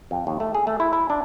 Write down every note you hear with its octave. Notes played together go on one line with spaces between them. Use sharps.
F2
D#2
A3
G#4
A3
E4
E4
D4